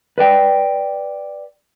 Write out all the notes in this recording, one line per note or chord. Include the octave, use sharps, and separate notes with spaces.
B4 D5 G5